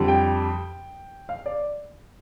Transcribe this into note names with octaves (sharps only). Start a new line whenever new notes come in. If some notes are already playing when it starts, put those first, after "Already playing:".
Already playing: F2 D3 G3
G5
F5
D5